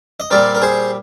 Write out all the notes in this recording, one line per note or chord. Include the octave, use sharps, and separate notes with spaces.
D#5
A#2 G3 C4 A#4 D5
A#4
G#4 C5